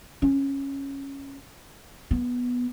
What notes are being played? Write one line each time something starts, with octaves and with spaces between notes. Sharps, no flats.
C#4
B3